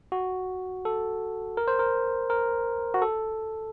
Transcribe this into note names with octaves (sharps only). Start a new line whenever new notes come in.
F#4
A4
A#4
C5
A#4
A#4
F#4
A4